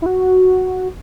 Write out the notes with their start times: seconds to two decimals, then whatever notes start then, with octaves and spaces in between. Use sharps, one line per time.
0.02 E4
0.06 F#4